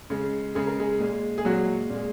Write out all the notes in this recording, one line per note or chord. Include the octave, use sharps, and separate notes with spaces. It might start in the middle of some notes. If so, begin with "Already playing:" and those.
C#3 G#3
C#3 G#3 G#4
A#4
G#3 G#4
A#2 G#3
G#4
A#2 F#3 G#3 F#4
A#2 G#3